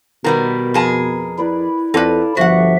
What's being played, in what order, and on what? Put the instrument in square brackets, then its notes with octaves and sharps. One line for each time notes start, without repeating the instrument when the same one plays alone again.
[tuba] B2 [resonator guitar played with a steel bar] D#3 G3 B3 [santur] A#4 B4
[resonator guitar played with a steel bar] F2 G#4 A5
[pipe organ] E4 [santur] B4 D5
[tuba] F2 [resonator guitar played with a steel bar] C4 B4 [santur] A4 D5 F5
[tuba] G1 [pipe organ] F3 E5 [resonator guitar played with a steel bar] F#4 F#5